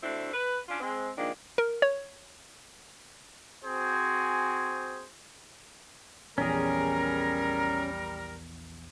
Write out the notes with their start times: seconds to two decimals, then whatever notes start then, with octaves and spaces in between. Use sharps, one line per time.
0.02 D2 A3 C4 D4 E4
0.33 B4
0.68 C#4 D4 F4
0.80 G#3 C4
1.17 D#3 F3 G#3 A#3 D4
1.58 A#4
1.82 C#5
3.64 C4 F#4 G#4 C5 G#5
6.38 A#1 E2 G3 C#4 G#4 A#4